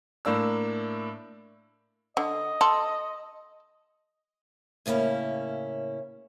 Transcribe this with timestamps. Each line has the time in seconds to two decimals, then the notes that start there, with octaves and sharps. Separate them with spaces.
0.25 A2 A#3 D4 E6
2.17 D3 D#5
2.61 A4 C6
4.86 A2 C#3 A#3 C#4 E4